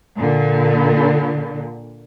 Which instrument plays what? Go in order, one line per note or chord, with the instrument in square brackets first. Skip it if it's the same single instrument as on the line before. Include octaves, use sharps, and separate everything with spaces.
[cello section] A#2 D3